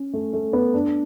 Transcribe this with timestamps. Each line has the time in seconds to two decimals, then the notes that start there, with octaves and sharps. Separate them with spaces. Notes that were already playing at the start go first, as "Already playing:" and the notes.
Already playing: C#4
0.13 A3
0.33 A3
0.53 B3
0.74 D4